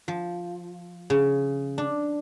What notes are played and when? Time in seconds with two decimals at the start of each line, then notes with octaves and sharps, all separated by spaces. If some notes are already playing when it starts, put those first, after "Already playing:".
0.08 F3
1.10 C#3
1.78 D4